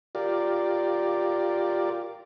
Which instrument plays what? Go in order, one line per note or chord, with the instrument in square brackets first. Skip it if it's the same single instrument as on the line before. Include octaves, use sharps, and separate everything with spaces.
[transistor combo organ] F4 G4 A#4 D5